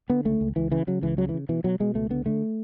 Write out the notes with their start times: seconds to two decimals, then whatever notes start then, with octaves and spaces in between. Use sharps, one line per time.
0.10 D3 B3
0.25 C#2 A3
0.41 C#2
0.56 C#2 E3
0.71 C#3 E3
0.87 C#3 F#3
1.02 C#2 E3
1.17 C#3 F#3
1.29 E3
1.34 C#3
1.49 B2 E3
1.64 B2 F#3
1.80 B2 G#3
1.95 C#2 A3
2.10 D3 B3
2.26 D3 A3